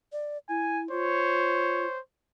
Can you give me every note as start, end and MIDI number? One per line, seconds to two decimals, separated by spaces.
0.12 0.38 74
0.49 0.90 64
0.49 0.81 80
0.91 1.87 65
0.91 1.99 72
0.91 2.00 73